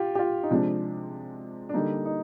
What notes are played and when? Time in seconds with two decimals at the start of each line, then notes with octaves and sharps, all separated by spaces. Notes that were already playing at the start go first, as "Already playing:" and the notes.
Already playing: F4 G4
0.15 G4
0.19 F4
0.43 D#4
0.51 C3 F3 G#3 D4
1.69 D4
1.74 D3 G3 A#3 D#4
2.05 D#4